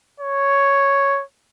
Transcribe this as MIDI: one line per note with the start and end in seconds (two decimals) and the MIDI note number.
0.20 1.23 73